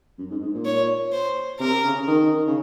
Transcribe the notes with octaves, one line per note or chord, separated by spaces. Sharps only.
F#2
G#2
G#2
A#2
C#5
C5
C3 A#4
C#3
D#3
C#3